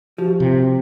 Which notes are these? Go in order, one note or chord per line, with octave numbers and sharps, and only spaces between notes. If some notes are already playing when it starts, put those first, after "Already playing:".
F3 F#4 G4
C3 C4